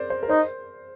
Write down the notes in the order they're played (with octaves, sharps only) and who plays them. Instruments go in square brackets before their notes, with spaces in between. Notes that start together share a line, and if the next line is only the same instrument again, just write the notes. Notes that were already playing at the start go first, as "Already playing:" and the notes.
Already playing: [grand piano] A#4 C5 D5
C5
A#4
[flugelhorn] D#4 [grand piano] C5